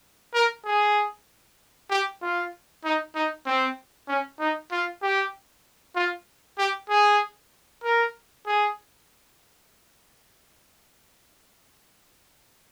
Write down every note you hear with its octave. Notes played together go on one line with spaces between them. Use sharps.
A#4
G#4
G4
F4
D#4
D#4
C4
C#4
D#4
F4
G4
F4
G4
G#4
A#4
G#4